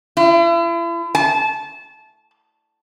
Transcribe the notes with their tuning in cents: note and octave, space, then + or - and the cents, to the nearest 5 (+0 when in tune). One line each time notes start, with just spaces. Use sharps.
E4 +40
A5 -20